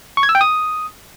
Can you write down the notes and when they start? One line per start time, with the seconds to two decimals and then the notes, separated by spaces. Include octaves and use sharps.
0.17 C#6
0.23 G#6
0.29 E6
0.35 G5
0.41 D#6